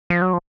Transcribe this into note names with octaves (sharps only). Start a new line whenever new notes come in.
F3
F#3
F3